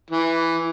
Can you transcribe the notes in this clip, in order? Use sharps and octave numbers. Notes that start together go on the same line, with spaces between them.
E3